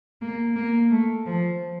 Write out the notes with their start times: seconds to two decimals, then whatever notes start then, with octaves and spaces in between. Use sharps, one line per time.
0.21 A#3
0.56 A#3
0.91 A3
1.26 F3